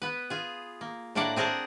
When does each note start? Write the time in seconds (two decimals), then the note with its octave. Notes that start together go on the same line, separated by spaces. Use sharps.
0.02 B3 B4
0.30 F4 G#4
0.81 A#3
1.15 A2 A#3 D4 A#4 D5 F#5
1.36 C4 G#4 A#4 F#5 A5